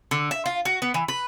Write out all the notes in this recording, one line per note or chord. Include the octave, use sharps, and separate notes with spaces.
D3
E5
F4
F#4
B3
E3
B4